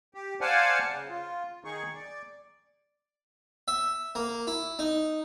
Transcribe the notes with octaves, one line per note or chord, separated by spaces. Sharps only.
G4
C5 D5 F5 F#5 G#5 A5
C#3
F4
D#3 D#4 G#4 C#6
D5
E5
A#3
E4
D#4